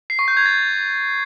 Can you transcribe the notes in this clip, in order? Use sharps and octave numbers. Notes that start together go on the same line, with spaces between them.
C7
C#6
G6
G#6
A6